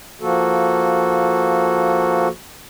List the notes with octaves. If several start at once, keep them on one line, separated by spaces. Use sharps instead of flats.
F3 A#3 F#4 A4